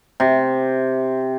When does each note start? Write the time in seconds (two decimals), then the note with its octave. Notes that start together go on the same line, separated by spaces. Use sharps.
0.20 C3